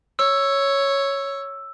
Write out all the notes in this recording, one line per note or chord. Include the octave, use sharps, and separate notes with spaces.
C#5 E6